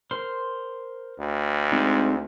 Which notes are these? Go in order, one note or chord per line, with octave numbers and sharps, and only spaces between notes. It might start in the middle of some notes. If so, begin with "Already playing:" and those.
A#4 C5 C6
D2
G#3 C4 D#4